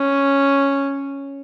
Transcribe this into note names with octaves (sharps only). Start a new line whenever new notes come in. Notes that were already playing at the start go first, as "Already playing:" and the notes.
Already playing: C#4